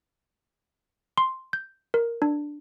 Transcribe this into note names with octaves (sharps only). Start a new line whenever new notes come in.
C6
G6
A#4
D4